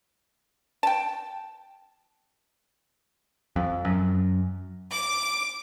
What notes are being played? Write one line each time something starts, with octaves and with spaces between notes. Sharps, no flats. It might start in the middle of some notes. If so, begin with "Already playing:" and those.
G5 A5
F2
F#2
D6